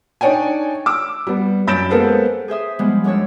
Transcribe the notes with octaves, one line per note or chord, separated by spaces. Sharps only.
D4 D#4 C#5 D5 G5 G#5
D6 E6
G3 B3
F#2 B5 G6 A6 D7 E7
G#3 A#3 B3 A4 B4 C5
G#4 C5 E5 D#6
F3 G3 G#3 B3
F#2 G#3 D4 C#5 E6